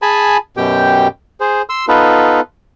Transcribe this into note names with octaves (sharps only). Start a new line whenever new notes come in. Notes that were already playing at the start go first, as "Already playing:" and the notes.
G#4 G#5 A5 B5
F#2 B2 G4 G5
G#4 C5
C6 E6
B3 D#4 F4 A4 B4